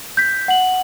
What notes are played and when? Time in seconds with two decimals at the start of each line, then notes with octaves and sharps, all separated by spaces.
0.17 G6 B6
0.48 F#5 F#7